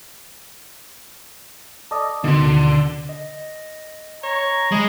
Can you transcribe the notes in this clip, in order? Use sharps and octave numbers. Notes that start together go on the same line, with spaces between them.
A4 D5 D#5
D2 B2 D3 D#3 C6
D#5
C#5 A#5
G#3 D#5 B5